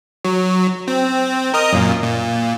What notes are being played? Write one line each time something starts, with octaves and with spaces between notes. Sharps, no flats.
F#3
C4
A#4 D#5 D#6
F#2 A#2
A#2